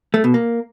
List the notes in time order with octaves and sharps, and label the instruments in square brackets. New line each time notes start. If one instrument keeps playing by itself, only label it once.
[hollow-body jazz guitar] A3
B2
A#3